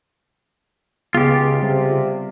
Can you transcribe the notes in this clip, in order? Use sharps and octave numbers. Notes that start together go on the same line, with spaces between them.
C#2 C#3 B3 F4 G4 G#4
C3 G3